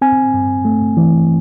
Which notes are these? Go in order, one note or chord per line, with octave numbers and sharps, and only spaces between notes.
C4 G#5
G2
A3
E3